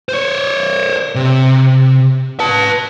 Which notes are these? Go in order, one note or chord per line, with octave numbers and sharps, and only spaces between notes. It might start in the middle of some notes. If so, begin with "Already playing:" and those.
C5 C#5
C3
B4 A5